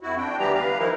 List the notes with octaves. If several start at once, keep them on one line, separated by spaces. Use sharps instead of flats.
F2 E4 F#4
D4 G5
D2 E3 G3 B3 G4 A#5
B4 F5 A#5
D#3 F3 D#4 E4 A#4